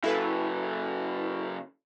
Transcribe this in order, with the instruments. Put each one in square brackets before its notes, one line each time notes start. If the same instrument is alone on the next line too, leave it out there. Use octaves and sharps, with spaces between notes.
[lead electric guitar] C#3 F#3 [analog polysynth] E4 A4 B4